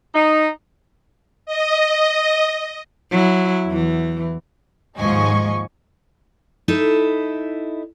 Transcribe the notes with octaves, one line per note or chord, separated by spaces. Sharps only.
D#4
D#5
F#3 E4
E2 E3
D#2 G#2 F3 D#5 G#5 C#6
D#4 E4 A4